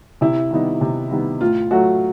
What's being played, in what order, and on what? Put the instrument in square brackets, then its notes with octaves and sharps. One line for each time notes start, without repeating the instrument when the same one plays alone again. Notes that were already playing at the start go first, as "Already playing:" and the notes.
[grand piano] C3 [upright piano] E4
[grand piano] D#3 G3 B3 D#4
C3
D#3 G3 B3 D#4
[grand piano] A2 [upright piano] F4
[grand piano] F#3 A3 [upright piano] F#4